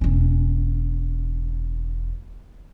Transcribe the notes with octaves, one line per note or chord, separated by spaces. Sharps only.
E1 C#4